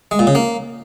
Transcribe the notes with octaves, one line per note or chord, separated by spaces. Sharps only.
G#3
A#2
C#3
A#3